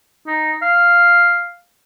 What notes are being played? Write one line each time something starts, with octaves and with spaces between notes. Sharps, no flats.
D#4
F5